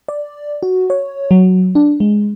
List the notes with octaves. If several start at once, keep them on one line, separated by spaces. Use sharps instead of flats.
D5
F#4
C#5
F#3
D4
G#3